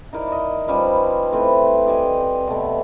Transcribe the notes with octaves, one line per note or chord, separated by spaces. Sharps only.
D#4 E4 A#4 D5
D#5
F3 G3 C#4 B4
A3 C4 E4 B4
G4 D5 D#5 G#5
B2 A3